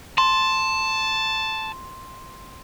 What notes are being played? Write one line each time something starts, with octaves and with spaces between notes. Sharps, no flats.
A5 C6